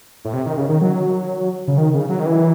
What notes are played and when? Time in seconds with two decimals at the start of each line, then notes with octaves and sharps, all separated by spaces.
0.25 A2
0.33 C3
0.46 D#3
0.57 C#3
0.69 D#3
0.81 F#3
1.68 C#3
1.78 D#3
1.94 C#3
2.09 F#3
2.20 D#3
2.26 E3